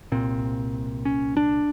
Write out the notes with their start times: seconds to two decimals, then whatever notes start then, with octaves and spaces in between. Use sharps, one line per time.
0.12 C2 A#2 C4
1.05 C#4
1.37 D4